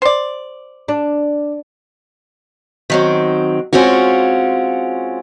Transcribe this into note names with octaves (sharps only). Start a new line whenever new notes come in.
C5 D5
D4
D#3 F#3 C4
G#3 C4 C#4 F4 F#4